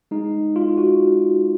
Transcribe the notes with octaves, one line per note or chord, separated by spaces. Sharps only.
G#3 D#4
G#3 F4
F#4